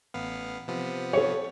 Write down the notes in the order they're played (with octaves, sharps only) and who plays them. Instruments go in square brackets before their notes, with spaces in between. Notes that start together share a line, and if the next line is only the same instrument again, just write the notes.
[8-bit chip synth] A1 B3 F5
C3 F3 B3
[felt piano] A4 C#5